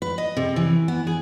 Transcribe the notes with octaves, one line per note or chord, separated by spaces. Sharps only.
B4
D#5
C3
E3
B3
G#4